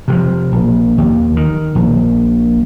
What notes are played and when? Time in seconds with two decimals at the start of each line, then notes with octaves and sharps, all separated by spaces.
0.08 C3 D#3 F3
0.52 A#1
0.98 D#2
1.37 D#3
1.75 A#1